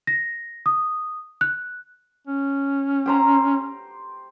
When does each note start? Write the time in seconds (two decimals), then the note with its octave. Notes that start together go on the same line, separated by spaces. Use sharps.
0.07 A#6
0.66 D#6
1.41 F#6
2.27 C#4
3.06 G4 C5 A#5